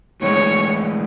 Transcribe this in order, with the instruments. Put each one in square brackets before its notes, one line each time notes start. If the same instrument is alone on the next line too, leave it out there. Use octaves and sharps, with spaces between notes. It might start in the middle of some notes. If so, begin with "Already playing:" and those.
[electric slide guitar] A2 E3 G#3 [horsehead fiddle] C#5